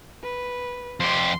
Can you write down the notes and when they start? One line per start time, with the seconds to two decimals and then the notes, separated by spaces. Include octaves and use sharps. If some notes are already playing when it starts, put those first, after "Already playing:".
0.23 B4
1.00 F2 G4 C6